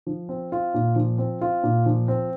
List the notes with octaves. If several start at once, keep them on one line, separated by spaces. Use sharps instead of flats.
F3
C4
F4
A#2
F3
C4
F4
A#2
F3
C4